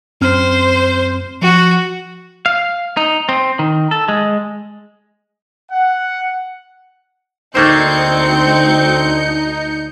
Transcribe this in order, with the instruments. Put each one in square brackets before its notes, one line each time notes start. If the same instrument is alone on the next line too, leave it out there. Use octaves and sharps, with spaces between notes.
[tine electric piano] F#2 C4 F6 [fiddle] C5
[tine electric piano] F3 [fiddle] F#4
[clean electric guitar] F5
D#4
C4
D#3
A4
G#3
[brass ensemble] F#5
[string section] D2 G6 C#7 [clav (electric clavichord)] A3 A#3 C5 [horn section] C4 [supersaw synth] D#4